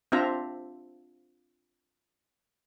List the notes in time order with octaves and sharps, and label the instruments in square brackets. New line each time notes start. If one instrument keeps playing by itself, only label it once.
[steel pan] C4 D4 F4 C5 E5 A#5